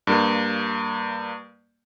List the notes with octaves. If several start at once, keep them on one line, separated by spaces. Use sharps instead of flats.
G2 A#3